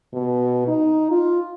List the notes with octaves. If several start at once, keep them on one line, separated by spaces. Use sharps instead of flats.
B2
D#4
F4